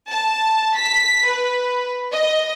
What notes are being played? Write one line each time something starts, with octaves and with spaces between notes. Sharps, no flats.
A5
B6
B4
D#5